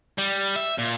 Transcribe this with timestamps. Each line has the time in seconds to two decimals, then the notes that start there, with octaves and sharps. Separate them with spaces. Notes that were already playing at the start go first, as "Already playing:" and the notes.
0.18 G3
0.56 E5
0.78 A#2